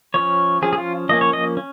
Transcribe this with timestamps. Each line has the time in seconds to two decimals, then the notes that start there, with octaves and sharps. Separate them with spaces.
0.14 F3 C#4 C#5
0.62 F3 C#4 G#4
0.73 G#4
0.78 F4
1.09 F3 A#3 C#4 D#5
1.21 C#5
1.33 D#5
1.57 C#4